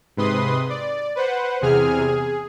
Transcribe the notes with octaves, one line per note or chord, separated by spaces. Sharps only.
G#2 C3 B4 C6 D#6
D5
B4 C5 F#5
E2 C3 G#4 G#5 F6
G#4